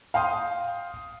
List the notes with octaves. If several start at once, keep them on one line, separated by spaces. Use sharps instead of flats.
F5 G5 C6 D#6